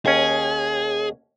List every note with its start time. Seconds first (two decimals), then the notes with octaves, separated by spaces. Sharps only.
0.06 D#2 C#4 G#4